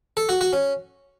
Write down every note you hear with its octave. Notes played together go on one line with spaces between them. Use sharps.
A4
F#4
F#4
C#4